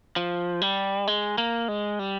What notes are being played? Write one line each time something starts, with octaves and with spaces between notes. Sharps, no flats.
F3
G3
G#3
A#3
G#3
G3